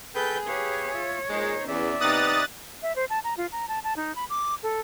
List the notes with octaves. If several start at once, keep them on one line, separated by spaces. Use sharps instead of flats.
G#4 A4 B4 G5 G6
G4 B4 C#5 F5
F4 E5
A#2 G#3 D#4 C5
E2 C#4 D5 E5
C3 B3 D#4 A#5 D#6 F#6 A6
E5
C5
A5
A#5
F4
A#5
A5
A5
D#4
B5
D6
A4